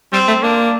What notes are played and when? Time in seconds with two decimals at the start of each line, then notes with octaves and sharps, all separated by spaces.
0.13 G3 C4
0.28 A3
0.43 A#3 D4